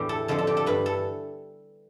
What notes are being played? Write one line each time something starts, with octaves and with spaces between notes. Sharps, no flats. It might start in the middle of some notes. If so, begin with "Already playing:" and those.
Already playing: E2 A2 E3 D4 G4
A4
F2 D3 F3 A4
A4
G4
A4
G2 E3 B4
A4